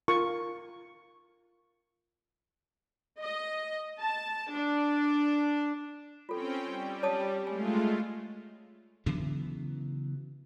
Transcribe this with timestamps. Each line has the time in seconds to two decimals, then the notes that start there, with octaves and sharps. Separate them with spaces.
0.08 F4 A#4 C#6
3.21 D#5
3.99 A5
4.50 D4
6.29 C4 C#4 F4 A4 G5
6.65 G3
7.03 C#5 A5 D#6
7.47 G#3 A3 F4 G#5
9.06 C#3 E3 F#3 B3